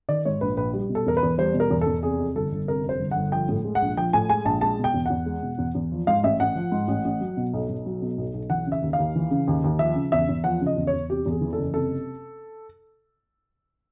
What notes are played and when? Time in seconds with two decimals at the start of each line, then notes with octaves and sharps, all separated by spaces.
0.09 D#3 D5
0.25 G#2 C#5
0.41 A#1 B4
0.57 A#1 B4
0.73 G3
0.89 B2
0.95 A4
1.06 E2 A#4
1.17 B4
1.23 E2
1.38 G3 C5
1.54 B2
1.60 A#4
1.70 E2
1.81 A4
1.86 E2
2.03 C3 G#4
2.19 F2
2.35 G1 A4
2.52 G1
2.68 C3 A#4
2.84 F2
2.89 C5
2.99 G1
3.11 G1 F#5
3.32 F3 G5
3.49 A2
3.65 G#3
3.75 F#5
3.82 A#1
3.97 F3 G5
4.13 A2 G#5
4.29 G#3 G#5
4.45 A#1 A5
4.61 G#3 A5
4.79 B2
4.84 G5
4.94 E2
5.06 E2 F#5
5.26 G#3
5.43 B2
5.58 E2
5.75 E2
5.92 F3
6.07 G#2 F5
6.23 A1 E5
6.40 A1 F#5
6.55 F3
6.72 G#2
6.88 A1
7.05 A1
7.21 F#3
7.37 B2
7.53 B1
7.69 B1
7.86 F#3
8.02 B2
8.18 B1
8.34 B1
8.50 E3 F#5
8.67 C#3
8.72 E5
8.82 D#2
8.93 F5
8.99 D#2
9.16 E3
9.31 C#3
9.48 D#2
9.64 D#2
9.79 F3 E5
9.95 C#3
10.12 E2 E5
10.29 E2
10.44 F3 F#5
10.61 C#3
10.66 D#5
10.77 E2
10.87 C#5
10.93 E2
11.09 C3 G4
11.26 E2
11.31 G#4
11.41 E3
11.53 F#1 A4
11.74 C3 A4